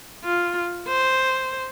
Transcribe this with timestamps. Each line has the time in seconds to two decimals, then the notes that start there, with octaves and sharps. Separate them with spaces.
0.24 F4
0.88 C5